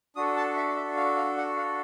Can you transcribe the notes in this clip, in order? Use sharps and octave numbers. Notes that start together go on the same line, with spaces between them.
D4 F#4 A4 D#6
A5
E5
E5
F5
F5
F#5
F5